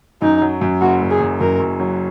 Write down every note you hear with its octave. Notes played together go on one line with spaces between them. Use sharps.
F#2 D#4
F#3
F#2
F#1 F#4
F#1
G#4
F#2
F#2 A#4
F#2
F#3